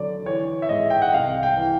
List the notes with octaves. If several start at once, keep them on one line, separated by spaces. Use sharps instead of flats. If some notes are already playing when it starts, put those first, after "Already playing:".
Already playing: D3 F#3 D5
E3 C#5
E5
G#2 D#5
G5
F#5
C2 F5
G5
E3